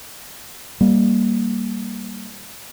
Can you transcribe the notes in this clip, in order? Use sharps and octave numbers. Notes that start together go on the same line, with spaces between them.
G3 A#3